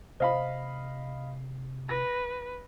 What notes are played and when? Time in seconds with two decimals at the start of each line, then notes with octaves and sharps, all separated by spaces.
0.20 C3 C5 D#5 F5 B5
1.89 B4 A#6